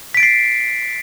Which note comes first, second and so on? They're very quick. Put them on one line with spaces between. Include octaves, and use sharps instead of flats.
B6 D7 A6 C7